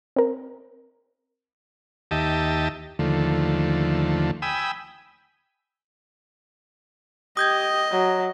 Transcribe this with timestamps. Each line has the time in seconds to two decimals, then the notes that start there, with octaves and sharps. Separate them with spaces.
0.16 C4 A#4
2.11 D#2 G4 D#5 E5 A5
2.99 D#2 D3 F3 A3
4.42 G5 G#5 B5 D#6 E6
7.37 G4 D#5 D#6 G6 G#6
7.91 F#3